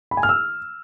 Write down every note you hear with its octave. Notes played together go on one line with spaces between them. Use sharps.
B5
G#5
F6
E6